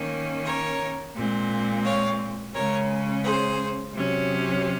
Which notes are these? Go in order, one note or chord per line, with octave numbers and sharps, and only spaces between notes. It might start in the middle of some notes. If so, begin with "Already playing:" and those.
Already playing: D#3 A#3 C#4
A#4 C#5
A#2 G#3 C4
C#5 F5
C#3 G#3 C#4 A#4 C#5
G#4 C5
C3 F#3 C#4